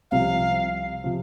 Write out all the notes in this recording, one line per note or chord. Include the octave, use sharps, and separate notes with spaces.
C2 C3 F3 F5
C3 F3